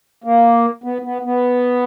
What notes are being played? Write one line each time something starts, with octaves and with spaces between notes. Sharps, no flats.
A#3
B3
B3
B3